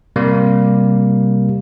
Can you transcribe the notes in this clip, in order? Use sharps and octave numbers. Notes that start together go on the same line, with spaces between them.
C3 G3 A#3